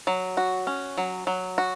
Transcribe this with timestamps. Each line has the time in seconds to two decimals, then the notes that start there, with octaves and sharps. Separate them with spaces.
0.07 F#3
0.37 F#4
0.67 C#4
0.98 F#3
1.27 F#3
1.58 F#4